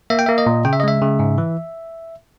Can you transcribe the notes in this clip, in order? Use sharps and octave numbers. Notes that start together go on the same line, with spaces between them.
A#3 E5
G5
A#3 E5
D#5
A#2
C#3 G5
E5
D#5
G#3 E5
C#3
G#2
E3